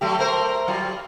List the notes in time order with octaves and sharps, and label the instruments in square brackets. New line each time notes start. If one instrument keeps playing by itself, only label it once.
[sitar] F#3 A3 G4
A3 A#4 C5
F#3 G3 F4